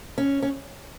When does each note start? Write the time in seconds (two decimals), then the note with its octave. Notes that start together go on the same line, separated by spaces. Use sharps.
0.18 C#4
0.42 C#4